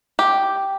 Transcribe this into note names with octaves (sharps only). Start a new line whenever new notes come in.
G4